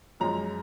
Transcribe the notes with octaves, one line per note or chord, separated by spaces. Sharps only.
F#2 F3 G#3 A#5